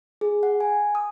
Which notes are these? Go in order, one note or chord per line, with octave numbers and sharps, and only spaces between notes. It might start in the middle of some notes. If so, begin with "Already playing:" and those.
G#4
F#5
G#5
D#6